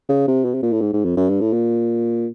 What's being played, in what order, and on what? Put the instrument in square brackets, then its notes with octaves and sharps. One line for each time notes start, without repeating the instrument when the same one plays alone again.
[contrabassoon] C#3
C3
B2
C3
A#2
A2
G#2
G#2
F2
F#2
G2
A2
A#2